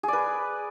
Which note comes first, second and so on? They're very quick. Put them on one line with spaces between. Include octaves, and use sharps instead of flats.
G#4 D5 B4